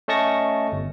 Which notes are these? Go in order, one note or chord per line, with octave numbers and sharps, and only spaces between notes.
A3 C#4 D#5 A5 C#6 A#6
G1